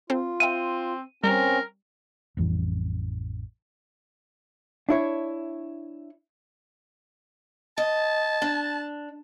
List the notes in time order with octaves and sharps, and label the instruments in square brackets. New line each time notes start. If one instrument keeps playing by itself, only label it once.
[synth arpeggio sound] C4 A4 C5 [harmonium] F4
[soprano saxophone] C4 [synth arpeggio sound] E5 F5 G5 [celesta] D#7
[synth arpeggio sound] G3 [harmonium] C4 C#4 [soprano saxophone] A#4
[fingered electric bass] A1 F2 E3 G3
[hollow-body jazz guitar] D4 E4 C#5
[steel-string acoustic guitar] D#5 [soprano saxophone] A5
[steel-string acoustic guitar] D4